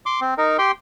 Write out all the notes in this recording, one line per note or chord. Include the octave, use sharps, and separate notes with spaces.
C6 D6
C4
D#4 A#4
G4 G5 C6